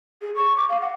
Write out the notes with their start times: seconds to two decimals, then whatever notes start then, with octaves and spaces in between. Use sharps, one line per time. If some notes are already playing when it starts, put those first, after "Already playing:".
0.22 G#4
0.36 C#6
0.56 D6
0.69 F5
0.81 F#5